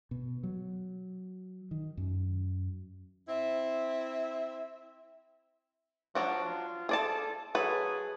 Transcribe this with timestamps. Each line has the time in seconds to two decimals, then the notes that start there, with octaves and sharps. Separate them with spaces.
0.11 B2
0.43 F#3
1.71 D#3
1.97 F#2
3.28 C4 E4 E5
6.15 F3 F#3 D4 F#4
6.44 F4
6.89 G#4 A4 D5 A5
7.55 F#3 G#4 A4 B4